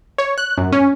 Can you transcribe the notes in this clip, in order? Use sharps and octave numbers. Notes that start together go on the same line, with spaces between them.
C#5
F#6
F#2
C#4